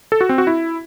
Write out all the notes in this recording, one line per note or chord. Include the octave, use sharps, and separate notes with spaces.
A4
F#4
C4
F#4
E4